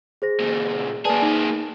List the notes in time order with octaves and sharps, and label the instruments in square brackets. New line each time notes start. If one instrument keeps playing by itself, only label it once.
[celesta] G#4 C5 A#6
[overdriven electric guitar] A#2 C#3
[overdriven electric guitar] A#3 G#4 [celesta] B4 D5 A5
[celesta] D#4